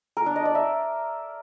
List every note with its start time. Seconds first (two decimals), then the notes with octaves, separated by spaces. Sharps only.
0.17 A#4
0.26 D4
0.36 D#5
0.45 D5
0.55 E5